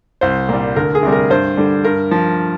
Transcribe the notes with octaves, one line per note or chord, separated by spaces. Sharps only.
C2 C5
A#2 G3
D2 A#4
G#4
C3 G3
A#4
G2 C5
D3 G3
G2 A#4
F3